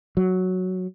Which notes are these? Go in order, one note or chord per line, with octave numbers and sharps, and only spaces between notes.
F#3